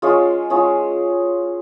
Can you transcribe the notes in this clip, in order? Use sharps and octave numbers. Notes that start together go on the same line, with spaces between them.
G#3 C#4 F4 G#4
G#3 C#4 F4 G#4